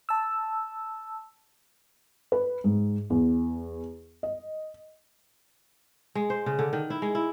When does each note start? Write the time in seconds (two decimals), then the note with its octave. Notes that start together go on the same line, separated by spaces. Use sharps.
0.09 A5 E6
2.32 B4
2.64 G#2
3.10 E2
4.23 D#5
6.15 G#3
6.30 C5
6.46 C#3
6.59 D3
6.73 D#3
6.90 E4
7.02 G#3
7.15 E4